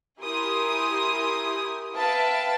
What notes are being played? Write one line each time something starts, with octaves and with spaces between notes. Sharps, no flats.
E4 G4 A#4 G#5 C6 D#6
B4 E5 F5 G5 A5